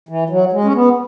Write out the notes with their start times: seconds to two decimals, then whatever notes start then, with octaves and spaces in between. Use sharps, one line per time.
0.09 E3
0.30 F#3
0.53 G#3
0.64 C#4
0.74 B3